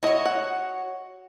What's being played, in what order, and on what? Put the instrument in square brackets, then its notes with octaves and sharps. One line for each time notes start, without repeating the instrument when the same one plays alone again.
[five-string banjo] E4 D#5 [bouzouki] F#4 C#5
[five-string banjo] F#5